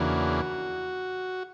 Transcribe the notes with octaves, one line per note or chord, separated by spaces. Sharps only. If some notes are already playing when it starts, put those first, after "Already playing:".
Already playing: E2 C#3 E3 A#3 D4 F#4